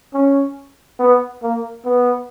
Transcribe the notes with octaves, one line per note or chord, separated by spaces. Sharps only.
C#4
B3
A#3
B3